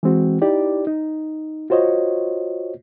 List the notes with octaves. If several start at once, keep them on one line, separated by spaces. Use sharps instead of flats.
E3 G#3 C4 F#4
D#4 E4 G4 D5
D#4
F4 F#4 C5 C#5 D#5